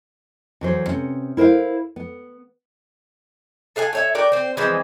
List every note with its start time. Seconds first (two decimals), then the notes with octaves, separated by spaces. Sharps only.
0.61 E2 F#3 C5
0.88 C3 B3 C#4
1.37 E4 A#4 C5 E5 F5
1.96 B3
3.76 A4 F5 F#5 G#5
3.93 A3 C#5 E5
4.15 F#4 A#4 D5 G5
4.32 C4 C5
4.57 E3 F3 G#3 C4